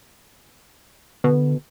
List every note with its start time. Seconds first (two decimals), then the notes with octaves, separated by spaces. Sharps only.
1.24 B2 D3